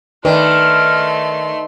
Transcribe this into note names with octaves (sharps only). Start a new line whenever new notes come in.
D#3 A3 B4 D5 C6 F6